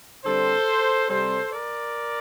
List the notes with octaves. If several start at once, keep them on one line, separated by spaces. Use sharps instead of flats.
D3 G3 C4 A4 C5
C3 G3 C4 A4 C5
A#4 D5